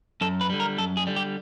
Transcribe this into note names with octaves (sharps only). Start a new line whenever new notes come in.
F#2 A4
B4
D3 G3
A#4
F#2 A4
G#4
D3 G3
G4